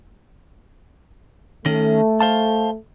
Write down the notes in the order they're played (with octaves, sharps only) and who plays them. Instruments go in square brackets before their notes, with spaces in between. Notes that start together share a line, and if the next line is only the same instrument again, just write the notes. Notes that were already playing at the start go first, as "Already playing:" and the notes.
[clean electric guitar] D#3 C#4 [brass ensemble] A3
[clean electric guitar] C5 F5 A5